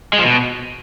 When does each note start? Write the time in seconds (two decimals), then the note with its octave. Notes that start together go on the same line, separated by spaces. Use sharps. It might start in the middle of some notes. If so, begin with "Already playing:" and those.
0.13 G#3
0.19 F3
0.24 B2